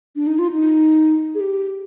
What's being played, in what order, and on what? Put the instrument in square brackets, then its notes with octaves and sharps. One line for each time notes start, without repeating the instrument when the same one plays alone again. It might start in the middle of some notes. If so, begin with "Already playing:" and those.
[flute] D4
D#4
F4
D#4
G#4
G4